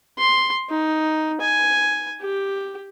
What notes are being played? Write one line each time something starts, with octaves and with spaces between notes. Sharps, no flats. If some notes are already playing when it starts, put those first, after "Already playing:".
C6
D#4
G#5
G4